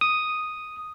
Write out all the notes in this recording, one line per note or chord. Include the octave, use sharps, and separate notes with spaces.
D#6